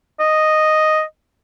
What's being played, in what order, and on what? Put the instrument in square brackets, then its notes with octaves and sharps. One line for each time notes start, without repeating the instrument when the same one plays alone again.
[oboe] D#5